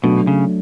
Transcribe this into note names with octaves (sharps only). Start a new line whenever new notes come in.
B2 F#3 A3 D4
C#3